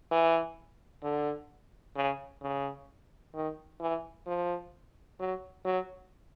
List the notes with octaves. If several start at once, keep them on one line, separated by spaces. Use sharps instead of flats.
E3
D3
C#3
C#3
D#3
E3
F3
F#3
F#3